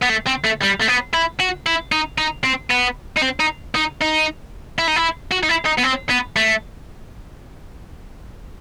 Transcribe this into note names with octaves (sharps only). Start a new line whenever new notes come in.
B3
A3
C4
A3
G3
A3
B3
E4
F#4
E4
D#4
D#4
C4
B3
D#4
C4
D#4
D#4
D#4
E4
D#4
E4
F#4
D#4
E4
D#4
B3
C4
B3
A3